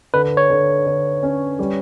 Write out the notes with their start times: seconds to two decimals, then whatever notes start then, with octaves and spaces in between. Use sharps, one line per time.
0.14 D3 B4
0.37 C#5
0.50 D3
0.86 D3
1.23 C#4
1.59 G3